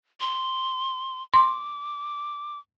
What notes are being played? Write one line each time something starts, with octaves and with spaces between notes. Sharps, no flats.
C6
C6 D6